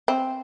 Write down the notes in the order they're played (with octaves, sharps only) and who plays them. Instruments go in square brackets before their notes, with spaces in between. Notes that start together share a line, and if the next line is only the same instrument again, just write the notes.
[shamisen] C4